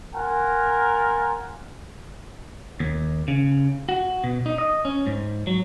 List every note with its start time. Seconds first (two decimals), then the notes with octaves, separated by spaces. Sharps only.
0.15 F4 A#4 F#5 G#5
2.80 D#2
3.28 C#3
3.89 F#4
4.24 B2
4.46 D#4
4.58 D#5
4.85 C#4
5.06 G#2
5.47 F#3